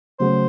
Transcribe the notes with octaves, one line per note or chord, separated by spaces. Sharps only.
C#3 F#3 A3 C5